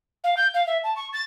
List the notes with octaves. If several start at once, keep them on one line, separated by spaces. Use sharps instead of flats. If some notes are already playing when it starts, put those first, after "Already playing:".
F5
G6
F5
E5
A5
C#6
A6